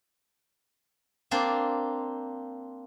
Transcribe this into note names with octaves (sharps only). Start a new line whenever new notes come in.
A#3 C4 D4 F4 C5